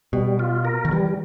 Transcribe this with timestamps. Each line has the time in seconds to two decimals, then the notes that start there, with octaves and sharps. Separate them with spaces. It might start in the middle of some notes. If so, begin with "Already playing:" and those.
0.13 B2 G3
0.39 F4
0.65 A#4
0.85 D#3
0.91 E3 G3